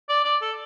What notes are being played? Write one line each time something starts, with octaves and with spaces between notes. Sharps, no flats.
D5
D5
A4